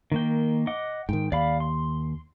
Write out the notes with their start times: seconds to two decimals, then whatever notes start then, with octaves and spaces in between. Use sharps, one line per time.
0.12 D#3 A#3 G5
0.67 D#5 F#5 D6
1.09 G#2 D#3 G5
1.32 D#2 D5 F5 B5
1.60 C6